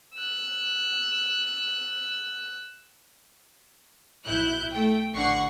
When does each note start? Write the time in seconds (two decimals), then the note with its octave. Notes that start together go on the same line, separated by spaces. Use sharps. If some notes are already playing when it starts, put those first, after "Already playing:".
0.14 E6 F#6
4.26 B1 E4 F#6 G6
4.72 A3 G5
5.13 A1 D3 F#5 C#6 C7